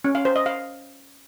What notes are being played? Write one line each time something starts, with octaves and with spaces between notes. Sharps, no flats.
C#4
F5
C5
D#5
F5